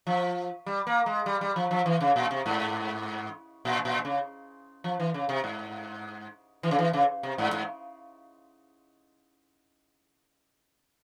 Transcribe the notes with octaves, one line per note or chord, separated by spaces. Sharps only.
F3
G3
A#3
G#3
G3
G3
F3
F3
E3
C#3
A#2
C3
G#2
A#2
A#2
C#3
F3
E3
C#3
C3
G#2
E3
C#3
E3
C#3
C3
G#2
G#2